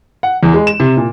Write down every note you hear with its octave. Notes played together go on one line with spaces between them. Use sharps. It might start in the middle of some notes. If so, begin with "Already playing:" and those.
F#5
E2
G#3
E7
C3
A#2